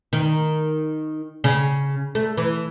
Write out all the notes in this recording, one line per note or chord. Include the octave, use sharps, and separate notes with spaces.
D#3
C#3
A3
E3